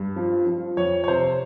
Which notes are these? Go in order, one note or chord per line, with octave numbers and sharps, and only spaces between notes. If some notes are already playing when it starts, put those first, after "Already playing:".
Already playing: G2
F3
F3
F2 C#5
C#5
C3 C5